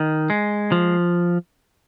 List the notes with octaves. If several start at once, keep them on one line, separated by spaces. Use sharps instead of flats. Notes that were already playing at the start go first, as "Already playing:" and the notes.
Already playing: D#3
G#3
F3